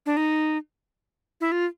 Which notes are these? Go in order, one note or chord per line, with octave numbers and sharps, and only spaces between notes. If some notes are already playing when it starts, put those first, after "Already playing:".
D4
D#4
E4
F4